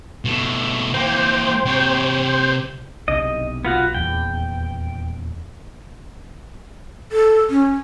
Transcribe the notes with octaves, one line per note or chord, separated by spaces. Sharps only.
B2 A3
E3 A#3 C5 G5
C3 C#5
B1 C3 D4 D#5
B3 F4 F#4
D#1 E2 G5
A4
C#4